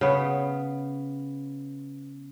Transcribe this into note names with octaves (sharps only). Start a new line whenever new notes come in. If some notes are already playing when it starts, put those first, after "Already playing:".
C#3 B3